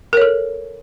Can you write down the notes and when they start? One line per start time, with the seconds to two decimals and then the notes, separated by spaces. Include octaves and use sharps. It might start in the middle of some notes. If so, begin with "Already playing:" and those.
0.13 A#4
0.17 C#5
0.22 A4